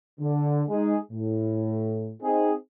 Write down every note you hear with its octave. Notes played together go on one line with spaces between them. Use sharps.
D3
G#3 D#4 G#4
A2
C4 D#4 G#4